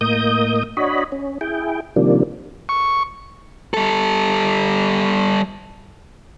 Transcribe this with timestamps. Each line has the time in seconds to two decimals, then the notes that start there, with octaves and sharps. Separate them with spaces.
0.01 A2 A#3 D#5 D#6 G6
0.77 D4 F#4 C#5 D#5 B5
1.12 C#4
1.41 E4 G#4 G5
1.96 C3 D#3 F3 G3 A#3 D4
2.69 C#6
3.74 G3 A4